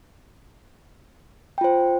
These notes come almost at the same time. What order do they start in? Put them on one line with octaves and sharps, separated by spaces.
G5 F4 C5